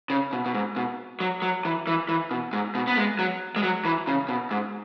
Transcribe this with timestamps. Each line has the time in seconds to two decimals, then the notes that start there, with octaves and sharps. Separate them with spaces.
0.10 C#3
0.33 B2
0.46 B2
0.55 G#2
0.76 B2
1.20 F#3
1.42 F#3
1.65 E3
1.87 E3
2.09 E3
2.31 B2
2.53 G#2
2.75 B2
2.87 B3
2.97 G#3
3.19 F#3
3.56 G#3
3.63 F#3
3.85 E3
4.07 C#3
4.29 B2
4.51 G#2